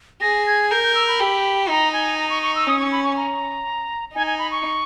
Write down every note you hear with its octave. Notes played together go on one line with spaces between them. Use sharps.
G#4 A#6
G#6
A#4 G6
G6
E6
B5
G4
D#4 A#5
G#5
A#5
C#6
C#6
E6
C#4 D#6
C#6
B5
C#6
A#5
D#4 G#5
G#5
B5
C#6